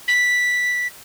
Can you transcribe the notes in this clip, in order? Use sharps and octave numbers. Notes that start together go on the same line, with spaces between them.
B6